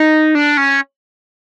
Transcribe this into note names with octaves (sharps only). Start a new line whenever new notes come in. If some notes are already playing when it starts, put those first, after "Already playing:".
Already playing: D#4
D4
C#4